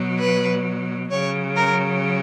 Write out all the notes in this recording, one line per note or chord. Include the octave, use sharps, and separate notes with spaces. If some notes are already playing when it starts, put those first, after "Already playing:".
Already playing: B2 F#3
B4
C#3 F#3 C#5
A#4